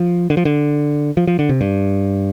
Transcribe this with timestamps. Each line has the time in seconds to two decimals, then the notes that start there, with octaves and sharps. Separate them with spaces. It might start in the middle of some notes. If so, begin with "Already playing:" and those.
Already playing: F3
0.30 D3
0.37 F3
0.45 D3
1.17 F3
1.27 F3
1.39 D3
1.49 C3
1.61 G2